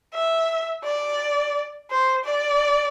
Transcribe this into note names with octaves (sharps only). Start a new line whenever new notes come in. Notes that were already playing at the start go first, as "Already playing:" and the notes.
E5
D5
C5
D5